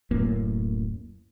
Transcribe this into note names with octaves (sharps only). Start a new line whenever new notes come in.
D1 F#2 A2 A#3